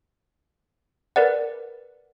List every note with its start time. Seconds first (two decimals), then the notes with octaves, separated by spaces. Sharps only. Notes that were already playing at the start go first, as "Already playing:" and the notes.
1.16 A#4 B4 D5 F#5